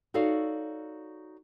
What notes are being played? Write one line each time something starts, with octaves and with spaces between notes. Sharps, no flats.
D#4 F#4 A4 C#5 D5 F5